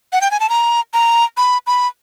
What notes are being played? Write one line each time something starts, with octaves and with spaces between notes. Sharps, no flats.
F#5
G5
G#5
A5
A#5
A#5
B5
B5